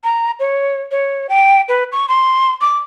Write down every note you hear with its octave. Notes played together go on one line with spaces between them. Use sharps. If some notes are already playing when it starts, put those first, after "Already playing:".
A#5
C#5
C#5
G5
B4
C#6
C6
D6